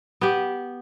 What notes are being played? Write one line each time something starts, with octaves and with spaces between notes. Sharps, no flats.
B3 G4